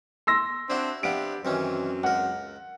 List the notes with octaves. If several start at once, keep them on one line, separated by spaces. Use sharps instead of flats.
C6 E6 A#6
C4 D4 E4 F#4
C3 F3 B3 D4 G4 F#5 D7
F#2 D#3 E3 C4 C#4
C#2 A#4 F#5